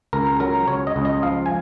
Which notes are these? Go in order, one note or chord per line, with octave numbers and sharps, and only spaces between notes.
C#2 A#4
F#3 A#4
C#2 C#5
D#5
C#2
D#5
F3 F5
G#5